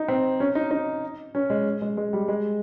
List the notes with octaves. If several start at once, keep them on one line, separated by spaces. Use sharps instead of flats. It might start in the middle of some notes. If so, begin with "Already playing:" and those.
Already playing: D#4
C4
C#4
D#4
D#4
C#4
G#3
G#3
G#3
G3
G#3